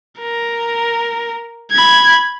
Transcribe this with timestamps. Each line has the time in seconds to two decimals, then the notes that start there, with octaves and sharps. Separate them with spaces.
0.20 A#4
1.72 B5 G#6